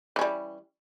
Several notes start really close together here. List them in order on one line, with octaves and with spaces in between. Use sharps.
E3 C#4 G3